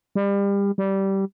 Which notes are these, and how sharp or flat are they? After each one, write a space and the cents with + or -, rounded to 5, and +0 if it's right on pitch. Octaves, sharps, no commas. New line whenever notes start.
G3 +30
G3 -15